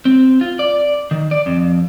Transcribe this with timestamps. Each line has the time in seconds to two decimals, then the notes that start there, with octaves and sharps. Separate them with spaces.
0.05 C4
0.41 F4
0.59 D5
1.11 D#3
1.31 D5
1.46 F2